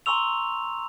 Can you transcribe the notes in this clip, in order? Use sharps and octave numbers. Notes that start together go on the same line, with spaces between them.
G#5 A#5 C6 C#6 E6 F7